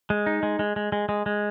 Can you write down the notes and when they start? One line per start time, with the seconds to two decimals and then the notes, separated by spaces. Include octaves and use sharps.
0.10 G#3
0.26 D#4
0.43 G#3
0.59 G#3
0.76 G#3
0.92 G#3
1.09 G#3
1.26 G#3